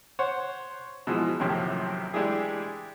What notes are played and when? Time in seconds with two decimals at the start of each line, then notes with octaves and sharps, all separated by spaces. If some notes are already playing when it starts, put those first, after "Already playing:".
0.19 C5 C#5 F#5
1.07 B2 E3 F3 G#3
1.40 A#1 F#2 A2 C3 D#3
2.14 E3 G#3 D4 E4 G4 G#4